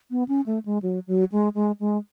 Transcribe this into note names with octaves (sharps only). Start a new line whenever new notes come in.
B3
C#4
A3
G#3
F#3
F#3
G#3
G#3
G#3